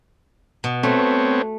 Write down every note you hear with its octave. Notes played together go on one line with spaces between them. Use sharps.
B2
A3 B3 C4 C#5